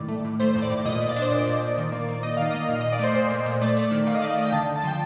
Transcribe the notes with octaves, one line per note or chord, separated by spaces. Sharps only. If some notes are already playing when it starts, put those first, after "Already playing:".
Already playing: A2 D#3 D5
A3
A2
A3 C5
A2
D5
A2
A#2 D#5
A#2
D5
D4
C5
A#2 D5
A#2
A#2
D#3
A#3
A#3
D#4 D#5
D#3 F5
A#3 D#5
A#2 F5
D#5
A#2
D5
A3 C5
A#2 C5
A#2
A#2
A3 D5
A3
D#3
D#3 F5
D#5
A3 D5
D#5
A3
G5
D3 A5
D3
A5
F3 G5